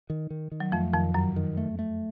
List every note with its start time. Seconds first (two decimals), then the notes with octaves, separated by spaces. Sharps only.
0.10 D#3
0.30 D#3
0.52 D#3
0.60 F#3
0.72 F2 F3 A3
0.93 F2 D#3 F3
1.14 F#2 D#3 F#3
1.36 D#3
1.57 A3
1.79 A3